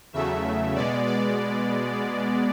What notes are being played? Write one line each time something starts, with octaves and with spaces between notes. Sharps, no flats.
E2 C#3 F#3 A3 E5
B2 G#3 B3 D5
D5